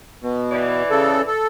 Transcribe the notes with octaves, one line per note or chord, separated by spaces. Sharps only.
B2
E3 D5
C#3 A4
A4